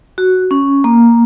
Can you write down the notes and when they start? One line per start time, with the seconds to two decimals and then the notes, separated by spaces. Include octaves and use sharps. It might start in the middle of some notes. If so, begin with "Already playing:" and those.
0.18 F#4
0.51 C#4
0.84 A#3